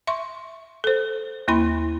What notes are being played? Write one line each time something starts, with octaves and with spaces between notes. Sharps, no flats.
E5 C6 C#6
A4 C5
D#2 A#3 E4 B5 C6